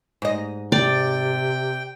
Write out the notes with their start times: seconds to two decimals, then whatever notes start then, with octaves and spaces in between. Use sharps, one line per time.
0.22 G#2 D#5
0.72 C3 D5 G5